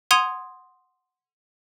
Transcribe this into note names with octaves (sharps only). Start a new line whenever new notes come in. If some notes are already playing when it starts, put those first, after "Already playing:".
F#5 C6 D#6 G#6 D#7 F7